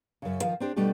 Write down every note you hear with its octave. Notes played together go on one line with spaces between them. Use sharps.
F#2 C#3
D#3 F3 F5
C4 D4 G4 C5
B2 G3 A3 D4 G4